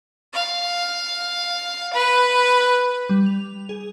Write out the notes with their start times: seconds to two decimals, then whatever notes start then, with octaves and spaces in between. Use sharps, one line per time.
0.34 F5
1.93 B4
3.09 G3
3.26 F7
3.69 G#4